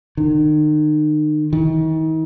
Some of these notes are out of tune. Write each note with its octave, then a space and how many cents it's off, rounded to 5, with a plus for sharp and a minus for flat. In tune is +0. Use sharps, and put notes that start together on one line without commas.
D#3 -40
D#3 +40